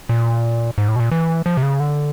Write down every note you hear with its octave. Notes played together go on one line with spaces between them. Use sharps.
A#2
G#2
A2
B2
A#2
E3
F3
C3
C#3
D3